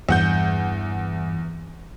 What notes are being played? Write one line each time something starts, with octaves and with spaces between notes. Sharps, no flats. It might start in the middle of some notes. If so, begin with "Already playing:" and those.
E2 G2 F#5 G6